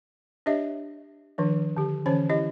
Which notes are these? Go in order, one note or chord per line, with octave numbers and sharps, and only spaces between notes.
D4 G4 C#5 D#5 E5
D#3 F3 D4
D3 G4
D3 E3 C#4 C5 C#5
E4 G4 D#5